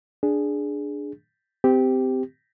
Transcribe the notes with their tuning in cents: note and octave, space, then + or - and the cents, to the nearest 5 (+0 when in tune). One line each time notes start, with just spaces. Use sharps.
D4 +0 G#4 +0
C4 -25 G4 +0